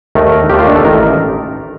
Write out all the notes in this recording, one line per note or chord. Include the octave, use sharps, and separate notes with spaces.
D#2 D#3 A3 A#4
A#4
D#2 D#3 A3 G4
F4
D4
A4
A1 D#3 A#4